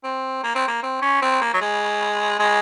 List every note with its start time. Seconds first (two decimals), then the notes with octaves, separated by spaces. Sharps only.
0.04 C4
0.43 A#3
0.55 C4
0.68 A#3
0.83 C4
1.02 C#4
1.22 C4
1.41 A#3
1.54 F#3
1.61 G#3
2.39 G#3